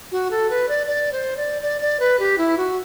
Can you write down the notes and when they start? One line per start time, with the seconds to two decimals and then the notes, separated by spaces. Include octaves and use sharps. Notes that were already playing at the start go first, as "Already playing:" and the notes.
0.12 F#4
0.31 A4
0.50 B4
0.69 D5
0.87 D5
1.12 C5
1.37 D5
1.62 D5
1.81 D5
2.00 B4
2.19 G4
2.38 E4
2.58 F#4